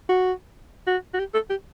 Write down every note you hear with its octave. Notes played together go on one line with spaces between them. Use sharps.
F#4
F#4
F#4
G4
A4
G4